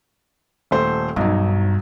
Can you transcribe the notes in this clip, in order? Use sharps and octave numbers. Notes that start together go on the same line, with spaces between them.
D#1 A3 C5
B1 G2 F#3 D#4